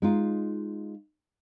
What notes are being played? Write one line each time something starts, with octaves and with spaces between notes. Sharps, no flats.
G#3 D#4 F4